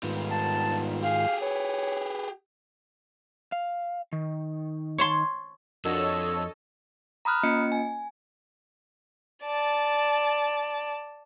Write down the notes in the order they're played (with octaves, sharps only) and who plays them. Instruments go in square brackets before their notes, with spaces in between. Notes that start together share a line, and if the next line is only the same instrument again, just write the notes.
[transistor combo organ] G#2 D#3 F4 [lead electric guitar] G3 B3
[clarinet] A5
[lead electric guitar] G4 G#4 [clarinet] F5
[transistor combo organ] B4 [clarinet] C#5
[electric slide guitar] F5
D#3
[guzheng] C#5 A5 C6
[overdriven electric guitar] F2 [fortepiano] D4 F#4 A#4 [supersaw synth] A4 C#5 D#5 [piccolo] E6
[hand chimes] A#5 B5 D#6 F6 F#6
A#3 C#4 F4 D#5 C#7
G#5
[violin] D5 A5